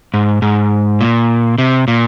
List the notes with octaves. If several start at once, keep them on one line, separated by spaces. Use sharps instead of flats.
G#2
G#2
A#2
C3
A#2